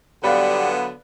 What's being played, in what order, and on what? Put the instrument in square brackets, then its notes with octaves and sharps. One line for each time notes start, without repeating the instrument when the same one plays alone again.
[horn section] D3 F#3 B3 [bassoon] G3 [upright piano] B4 D5 F5